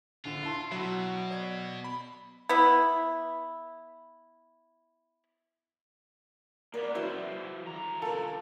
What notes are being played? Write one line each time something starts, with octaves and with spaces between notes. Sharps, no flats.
A#1 D3 F4 E7
E4 A5 C6
B2 F#3 E5 F#5
D5 G#6
B5
B3 E4
A#3 B3 A#4 D5
E3 F#3 E4 F#4 G#4 C5
D3 A#5
F4 A4 A#4